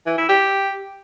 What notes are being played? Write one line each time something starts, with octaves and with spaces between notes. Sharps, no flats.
E3
E4
G4